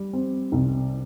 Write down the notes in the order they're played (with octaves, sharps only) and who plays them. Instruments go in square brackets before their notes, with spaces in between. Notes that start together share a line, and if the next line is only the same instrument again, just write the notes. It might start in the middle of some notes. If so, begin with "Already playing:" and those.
Already playing: [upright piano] G3
C4
C2